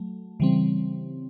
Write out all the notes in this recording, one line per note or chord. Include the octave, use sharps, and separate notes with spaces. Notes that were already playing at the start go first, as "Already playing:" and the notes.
Already playing: F#3 A3
C#3 E3 G3 C4